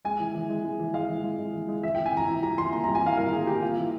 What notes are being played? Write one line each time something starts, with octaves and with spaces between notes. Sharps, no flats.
G#3 G#5
E3
E3
G#3
G#3
E3
G#3 F5
E3
G#3
G#3
E3
G#3
E3 E5
E3 G5
G#5
E3 A#5
E3
G3 A#5
E3 C6
A#3 A#5
G3 A#5
G#5
E3 F5
G3 A#4
A#3 G#4
G3 G4
A#3 F4
E3